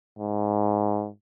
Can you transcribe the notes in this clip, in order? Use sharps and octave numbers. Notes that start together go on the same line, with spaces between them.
G#2